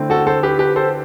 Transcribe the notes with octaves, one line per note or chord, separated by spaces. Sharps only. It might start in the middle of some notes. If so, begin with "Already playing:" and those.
Already playing: D3 A3 C4 E4
F#4 A4
A4 C5
G4 B4
G4 B4
A4 C5